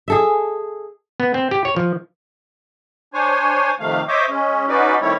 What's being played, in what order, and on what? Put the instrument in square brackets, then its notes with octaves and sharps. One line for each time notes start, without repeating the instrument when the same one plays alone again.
[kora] G#4 A4 E5
[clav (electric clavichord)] B3
C4
G4
C#5
F3
[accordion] D4 C5 C#5 G#5
F2 C3 D#3 A3 F5
C5 C#5 D#5 E5 D6
G#3 C#4
C#4 D#4 F#4 B4 D5
D#3 G3 A3 C4 E4 C#5